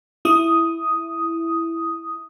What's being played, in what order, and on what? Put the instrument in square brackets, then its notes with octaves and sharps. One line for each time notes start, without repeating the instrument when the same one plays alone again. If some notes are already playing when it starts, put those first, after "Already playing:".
[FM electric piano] E4 D#6